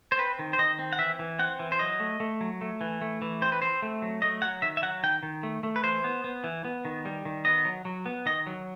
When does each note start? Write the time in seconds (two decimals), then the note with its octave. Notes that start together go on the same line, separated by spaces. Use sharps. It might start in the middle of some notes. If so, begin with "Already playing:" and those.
0.12 C5
0.18 C4 B4
0.39 D#3
0.53 C5
0.59 D#3 D#5
0.79 C4
0.93 F#5
0.99 E3 E5
1.19 E3
1.39 C4 F#5
1.59 E3
1.72 C5
1.79 F#3 D#5
2.00 A3
2.20 A3
2.41 F#3
2.61 A3
2.81 E3
3.01 A3
3.22 E3
3.42 C4 C5
3.52 B4
3.62 C4 C5
3.82 A3
4.02 F#3
4.22 A3 D#5
4.42 F#3 F#5
4.62 D#3 E5
4.77 E5
4.82 F#3 F#5
5.03 D#3 G5
5.23 D#3
5.43 A3
5.63 A3
5.76 B4
5.84 E3 C5
6.04 B3
6.24 B3
6.44 E3
6.65 B3
6.85 D#3
7.05 G3
7.25 D#3
7.45 B3 D#5
7.65 F#3
7.85 F#3
8.06 B3
8.26 D#3 D#5
8.47 F#3